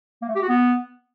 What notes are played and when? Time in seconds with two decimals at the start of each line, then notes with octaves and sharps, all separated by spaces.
0.22 A#3
0.29 A3
0.35 G4
0.42 F#4
0.49 B3